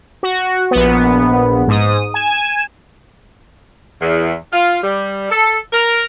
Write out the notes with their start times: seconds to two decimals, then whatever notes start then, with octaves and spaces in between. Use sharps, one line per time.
0.23 F#4
0.71 A#1 B3
1.68 G#2 D#6
2.14 G#5 E7
4.01 E2
4.52 F4
4.82 G3
5.30 A4
5.73 A#4